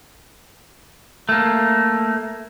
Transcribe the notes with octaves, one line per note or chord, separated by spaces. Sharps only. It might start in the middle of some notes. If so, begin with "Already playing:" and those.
A3 A#3